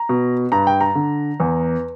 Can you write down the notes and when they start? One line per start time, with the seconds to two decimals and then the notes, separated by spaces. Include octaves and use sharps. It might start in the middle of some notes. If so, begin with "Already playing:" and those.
Already playing: A#5
0.09 B2
0.52 G2 A#5
0.67 G5
0.81 A#5
0.95 D3
1.40 E2